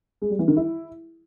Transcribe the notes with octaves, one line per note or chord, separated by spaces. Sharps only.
G#3
G3
E3
D#3
E4